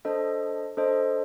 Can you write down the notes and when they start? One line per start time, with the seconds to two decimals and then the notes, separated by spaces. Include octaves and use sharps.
0.05 D4 A4 C5 D#5
0.77 D4 A4 C5 D#5